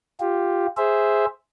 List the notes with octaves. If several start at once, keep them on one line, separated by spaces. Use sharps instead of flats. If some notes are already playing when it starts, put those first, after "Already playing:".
F4 G4
G#4 C5 E5